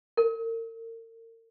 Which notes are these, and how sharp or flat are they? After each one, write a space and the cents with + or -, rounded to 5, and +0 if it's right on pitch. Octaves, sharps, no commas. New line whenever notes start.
A#4 -40